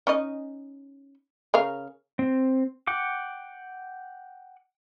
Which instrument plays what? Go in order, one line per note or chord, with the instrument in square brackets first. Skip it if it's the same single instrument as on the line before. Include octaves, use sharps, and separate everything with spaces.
[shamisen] C#4 D#4 D#5
C#3 A#4 F5
[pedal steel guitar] C4
F#5 G5 D6